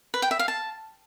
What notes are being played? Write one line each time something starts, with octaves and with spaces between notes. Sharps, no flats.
B4
G5
E5
F5
A5